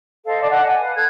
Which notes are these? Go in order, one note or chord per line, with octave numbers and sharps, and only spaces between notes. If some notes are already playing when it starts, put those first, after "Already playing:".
A4 C5 D#5 F5
D5 A5
D#5 F#5 A5
G#5
B4 F5
A4 F#6 G#6